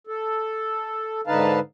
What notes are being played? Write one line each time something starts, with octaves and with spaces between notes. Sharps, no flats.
A4
G#2 D3 D#4 B4 F5 A5